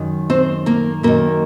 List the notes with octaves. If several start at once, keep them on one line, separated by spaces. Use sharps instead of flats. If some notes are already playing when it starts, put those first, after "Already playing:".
Already playing: F#2 D#3
C4 C5
A#3 A#4
F#2 D#3 A#3 A#4